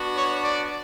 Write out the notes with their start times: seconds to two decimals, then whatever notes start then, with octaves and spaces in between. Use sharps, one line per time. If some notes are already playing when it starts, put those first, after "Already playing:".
Already playing: B3 D4 F#4
0.15 C#5
0.43 D5